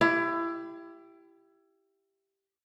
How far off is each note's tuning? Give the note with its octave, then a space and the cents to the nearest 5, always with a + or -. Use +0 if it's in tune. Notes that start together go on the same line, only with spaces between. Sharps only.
E4 +25 G4 +0 F5 -25